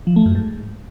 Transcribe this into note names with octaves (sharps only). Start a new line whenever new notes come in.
F3
A3
F#2
G#2